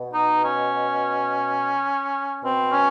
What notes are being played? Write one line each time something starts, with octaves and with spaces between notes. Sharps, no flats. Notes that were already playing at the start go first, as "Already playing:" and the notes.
Already playing: B2
D#4
C#4
B2 C4
C#4